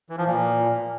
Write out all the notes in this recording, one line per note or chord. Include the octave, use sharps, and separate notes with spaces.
E3
F3
A#2